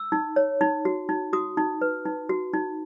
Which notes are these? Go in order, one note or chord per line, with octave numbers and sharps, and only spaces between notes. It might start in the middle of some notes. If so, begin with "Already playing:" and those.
Already playing: E6
D#4
C#5
D#4
F#4
D#4
F#4 D#6
D#4
B4
D#4
F#4
D#4